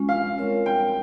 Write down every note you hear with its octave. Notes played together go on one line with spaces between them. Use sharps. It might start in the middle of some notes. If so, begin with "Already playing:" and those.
Already playing: G#3 C#4 F4
F5
G#3 C4 F4 A#4 C#5
G5